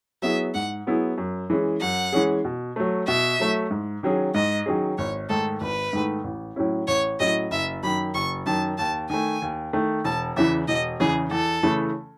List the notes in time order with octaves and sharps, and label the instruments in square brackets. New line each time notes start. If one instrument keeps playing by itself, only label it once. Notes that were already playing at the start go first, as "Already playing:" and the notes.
[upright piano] F#3 B3 E4 G#4 [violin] E5
[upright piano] G#2 [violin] F#5
[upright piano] F#3 B3 E4 G#4
F#2
E3 G#3 C#4 G#4
[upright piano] F#2 [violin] F#5
[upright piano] E3 G#3 C#4 G#4
B2
F#3 A3
[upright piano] B2 [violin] E5
[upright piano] F#3 A3
G#2
D#3 F#3 C#4 G#4
[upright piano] G#2 [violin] D#5
[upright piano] D#3 F#3 C#4 G#4
[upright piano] G#1 [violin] C#5
[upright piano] G#2 D#3 A3 [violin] A4
[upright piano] G#1 [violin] B4
[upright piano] G#2 D#3 A3
A1
A2 F#3 C#4 E4
[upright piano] A1 [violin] C#5
[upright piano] A2 F#3 C#4 E4 [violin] D#5
[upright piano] F#1 [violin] E5
[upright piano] F#2 D#3 [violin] B5
[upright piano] F#1 [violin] C#6
[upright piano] F#2 D#3 [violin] A5
[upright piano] D#2 [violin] A5
[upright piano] D#3 A3 [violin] G#5
[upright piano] D#2
D#3 A3
[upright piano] E1 [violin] A5
[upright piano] E2 C#3 E3 [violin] E5
[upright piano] E1 [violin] D#5
[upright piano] E2 C#3 E3 [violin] G#4
[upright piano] E2 [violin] A4
[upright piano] C#3 E3 A3 C#4